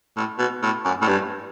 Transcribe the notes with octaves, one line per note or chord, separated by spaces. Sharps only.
A2
B2
A2
F#2
A2
G2